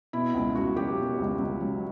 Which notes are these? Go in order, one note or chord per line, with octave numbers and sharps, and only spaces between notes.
B2 E4
C#2
C#2 F#4
F#3 G4
B2
C#2
C#2
F#3